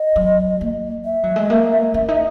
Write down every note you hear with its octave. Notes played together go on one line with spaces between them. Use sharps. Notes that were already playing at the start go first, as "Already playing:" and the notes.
Already playing: D#5
F#3
A#3
E5
F#3
G#3
A#3
C#4
D#4